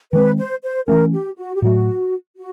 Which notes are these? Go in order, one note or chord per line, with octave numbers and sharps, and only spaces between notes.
D#3 G#3 C4 B4
C5
C5
E3 A3 C#4 A#4
G4
F#4
G4
A2 F#3 A3 F#4
F#4